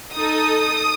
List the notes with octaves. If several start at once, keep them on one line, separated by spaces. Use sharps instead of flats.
D#4 A4 D#6